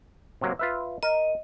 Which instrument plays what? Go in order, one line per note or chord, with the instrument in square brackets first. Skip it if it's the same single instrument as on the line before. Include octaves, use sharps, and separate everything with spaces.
[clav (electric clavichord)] C3 F#3 A#3
F4 B4 E5
[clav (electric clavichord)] A#4 [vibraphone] D#5